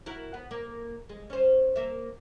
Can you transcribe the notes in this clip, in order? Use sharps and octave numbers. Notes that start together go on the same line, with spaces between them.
E4 F#4 A#4
B3
A#3
G#3
C#4 C5
A#3 E5